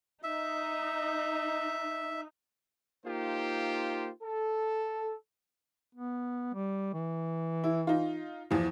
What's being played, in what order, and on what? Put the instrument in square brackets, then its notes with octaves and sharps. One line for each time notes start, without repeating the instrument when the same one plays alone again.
[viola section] D#4 [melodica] E5
[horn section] A#3 D#4 F4 G4 C5
A4
[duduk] B3
G3
E3
[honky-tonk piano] E4
D#4 F4
E2 E3 F3